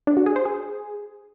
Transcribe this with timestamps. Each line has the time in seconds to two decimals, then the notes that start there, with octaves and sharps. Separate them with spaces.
0.07 D4
0.17 F#4
0.26 G#4
0.36 C5
0.45 G#4